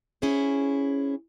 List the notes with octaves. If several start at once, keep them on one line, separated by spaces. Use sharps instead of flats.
C#4 E4 G#4 C5